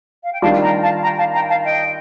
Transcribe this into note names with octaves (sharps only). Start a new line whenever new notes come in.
F5
G5
D#3 G3 D4 F4 F5 A5
G5 A#5
F5 A5
G5 A#5
F5 A5
G5 A#5
F5 A5
D#5 G5